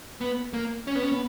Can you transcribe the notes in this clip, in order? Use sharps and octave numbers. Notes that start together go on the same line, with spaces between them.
B3
A#3
C#4
B3
C#4
B3